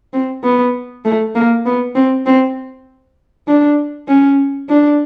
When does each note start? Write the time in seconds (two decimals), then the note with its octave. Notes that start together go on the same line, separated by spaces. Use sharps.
0.13 C4
0.44 B3
1.05 A3
1.35 A#3
1.66 B3
1.95 C4
2.26 C4
3.47 D4
4.08 C#4
4.69 D4